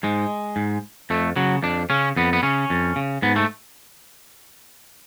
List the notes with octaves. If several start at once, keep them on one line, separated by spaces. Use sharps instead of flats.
G#2 G#3
G#2
F2 A3
C#3 F#3
F2 D4
C#3 C#4
F2 B3
B3
C#3 C#4
F2
C#3
G#2 B3
A3